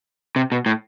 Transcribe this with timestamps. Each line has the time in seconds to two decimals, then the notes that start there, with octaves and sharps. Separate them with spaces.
0.36 C3
0.52 B2
0.66 A2